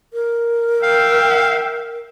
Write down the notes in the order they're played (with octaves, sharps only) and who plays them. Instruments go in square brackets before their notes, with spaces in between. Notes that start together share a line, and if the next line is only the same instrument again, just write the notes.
[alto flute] A#4
[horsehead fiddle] E5 G5 [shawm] F5